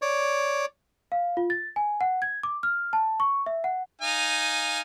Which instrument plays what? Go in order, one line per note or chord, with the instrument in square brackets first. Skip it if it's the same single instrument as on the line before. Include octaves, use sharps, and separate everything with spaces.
[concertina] C#5 D5
[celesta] F5
F4
A6
G#5
F#5
G#6
D6
F6
A5
C#6
E5
F#5
[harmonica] D#4 F5 G#5